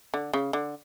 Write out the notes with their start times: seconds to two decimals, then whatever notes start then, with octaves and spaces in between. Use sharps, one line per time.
0.14 D3
0.33 C#3
0.53 D3